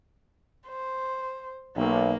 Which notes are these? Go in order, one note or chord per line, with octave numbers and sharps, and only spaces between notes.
C5
B1 A#3